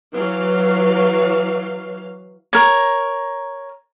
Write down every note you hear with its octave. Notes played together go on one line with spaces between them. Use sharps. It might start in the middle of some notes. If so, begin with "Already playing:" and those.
E3 F#3 F5
A#4 C#5